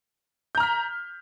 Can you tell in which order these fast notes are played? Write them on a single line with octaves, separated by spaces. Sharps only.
G6 A#5 F6 B6